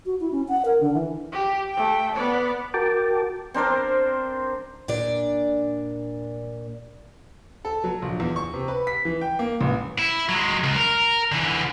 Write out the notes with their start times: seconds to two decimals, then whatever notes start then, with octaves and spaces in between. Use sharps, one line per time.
0.06 F#4
0.21 E4
0.32 C#4
0.48 F#5
0.65 A#4
0.81 D3
0.94 E3
1.32 G4
1.73 A3 G5
2.14 B3 D5
2.74 F#4 A#4 G5 A5 D6
3.54 C4 D4 A#4 C5
4.88 A#2 D4 D5
7.65 A4
7.84 F#3
8.02 A#1
8.20 E2
8.36 C#6
8.54 C3
8.68 B4
8.87 B6
9.05 E3
9.21 G5
9.39 A#3
9.61 A1
9.99 E4
10.29 F#3 G#3
10.64 C#2
10.76 A#4
11.32 D3 E3